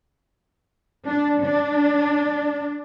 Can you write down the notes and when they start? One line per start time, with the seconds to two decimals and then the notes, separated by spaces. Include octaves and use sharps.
1.06 D4
1.41 D4